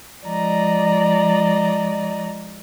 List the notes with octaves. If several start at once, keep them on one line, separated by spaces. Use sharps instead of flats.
F3 G#3 D5 D#5 A#5